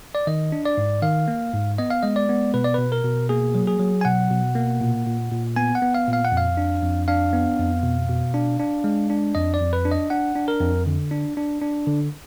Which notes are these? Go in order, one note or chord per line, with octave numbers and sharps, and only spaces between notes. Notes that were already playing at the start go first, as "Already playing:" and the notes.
D5
D#3 D#5
D4
D5
G#2
D#3 F5
A#3
G#2
B3 D#5
F5
G#3 D#5
D5
B3
B2 B4
D5
B2 B4
A#4
B2
A#3 G#4
F#3
G#4
F#3
G#5
B2 F#5
B2
A#3
A#2
A#2
A#2
B3 G#5
F#5
B3
F5
A#2
F5
F#5
F2
F5
D4
F2
D4 F5
B3
F2
B2
B2
D4
D4
G#3
D4
F2 D#5
D5
F2
B4
D4
D#5
D4 F#5
D4
A#4
F2
D3
D4
D4
D4
D3